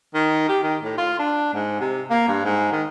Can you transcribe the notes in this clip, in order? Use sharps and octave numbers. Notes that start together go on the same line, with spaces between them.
D#3
G4
D#3
A2
F4
D4
G#2
C3
A#3
G2
G#2
D#3